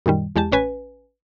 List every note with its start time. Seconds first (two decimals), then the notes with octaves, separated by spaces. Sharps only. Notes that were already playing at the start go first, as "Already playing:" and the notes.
0.06 F#2 A#2 D#3 G3
0.36 E2 G#3 G4 A5
0.52 A1 C#4 B4 G#5